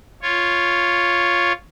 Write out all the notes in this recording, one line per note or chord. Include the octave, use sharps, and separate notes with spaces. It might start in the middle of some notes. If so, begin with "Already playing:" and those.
F4 C#5